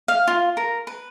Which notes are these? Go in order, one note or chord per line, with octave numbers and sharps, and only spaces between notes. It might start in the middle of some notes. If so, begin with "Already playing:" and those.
F5
F4
A#4
B4